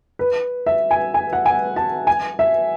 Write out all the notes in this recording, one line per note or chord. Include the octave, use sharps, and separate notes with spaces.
B4
E5
G#5
G#5
F#5
G#5
A5
G#5
E5